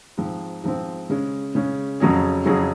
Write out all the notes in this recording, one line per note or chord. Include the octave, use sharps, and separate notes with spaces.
G#2 F3 C4
G#2 F3 C4
C#3 G#3 C#4
C#3 G#3 C#4
F2 C#3 F#3 C#4 G#4
F2 C#3 F#3 C#4 G#4